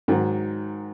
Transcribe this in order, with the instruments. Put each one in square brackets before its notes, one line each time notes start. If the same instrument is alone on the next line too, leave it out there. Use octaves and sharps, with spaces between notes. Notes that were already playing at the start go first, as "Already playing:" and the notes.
[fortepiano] G#2 D#3 F#3